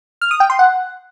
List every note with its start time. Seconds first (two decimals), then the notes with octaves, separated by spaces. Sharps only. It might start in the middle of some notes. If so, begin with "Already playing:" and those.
0.21 F6
0.31 D#6
0.40 G5
0.50 C6
0.59 F#5